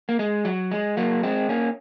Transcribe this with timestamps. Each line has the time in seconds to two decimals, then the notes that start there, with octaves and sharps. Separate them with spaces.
0.09 A#3
0.19 G#3
0.45 F#3
0.71 G#3
0.97 F#3 A#3
1.23 G#3 C4
1.49 A#3 C#4